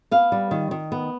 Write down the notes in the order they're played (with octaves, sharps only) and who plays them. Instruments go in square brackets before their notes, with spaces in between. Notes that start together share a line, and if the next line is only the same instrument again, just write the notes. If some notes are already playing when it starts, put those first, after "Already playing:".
[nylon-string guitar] B3 F5
G3
D#3
D#3
B3